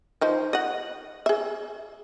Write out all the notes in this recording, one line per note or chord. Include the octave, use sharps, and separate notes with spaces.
F3 D#4 C5
D#5 F#5
G#4 E5